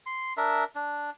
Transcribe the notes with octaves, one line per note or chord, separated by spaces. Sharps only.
C6
D4 A#4 E5
D4